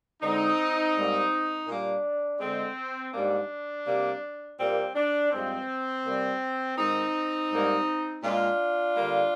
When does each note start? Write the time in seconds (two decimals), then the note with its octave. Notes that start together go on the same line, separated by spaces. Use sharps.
0.22 D3 G#3 C4 D#4
0.95 G#2 G3 A#3
1.67 A#2 G3 A#3 D4
2.40 D3 G#3 C4
3.13 G#2 G3 A#3 D4
3.86 C3 G3 A#3
4.58 A#2 G3 A#3 C4
4.95 D4
5.31 G2 F3 G#3 C4
6.05 C3 G3 A#3
6.77 G#2 D#3 G#3 C4 D#4
7.50 G#2 G3 A#3
8.23 A#2 G#3 D4 F4
8.96 D3 G3 A#3